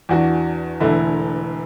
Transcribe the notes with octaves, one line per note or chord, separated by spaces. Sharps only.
E2 E3 D4 F#4
E1 E2 D3 A3 E4